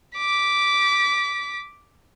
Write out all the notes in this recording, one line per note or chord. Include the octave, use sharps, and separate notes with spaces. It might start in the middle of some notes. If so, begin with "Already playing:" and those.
D6 B6